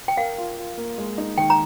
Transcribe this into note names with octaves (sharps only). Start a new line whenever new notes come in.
G5
A#4 F5
F4
F4
A#3
G#3
D#4
D#3 G5
A#5